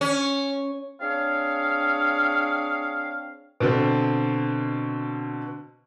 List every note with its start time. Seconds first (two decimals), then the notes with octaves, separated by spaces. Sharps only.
0.01 C#4
1.01 C4 D4 G#4 C#5 F5
3.60 B2 D3 C4